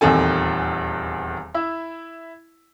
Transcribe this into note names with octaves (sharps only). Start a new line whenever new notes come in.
D#1 E2 D#3 C4 A4 G#5
E4 E5